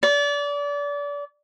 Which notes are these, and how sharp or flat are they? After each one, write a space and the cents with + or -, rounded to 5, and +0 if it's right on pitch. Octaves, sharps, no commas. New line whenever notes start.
D5 -30